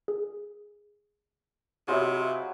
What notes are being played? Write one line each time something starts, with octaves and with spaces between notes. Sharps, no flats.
G#4
C3 F#3 E4 F4 G#4 D#5 E5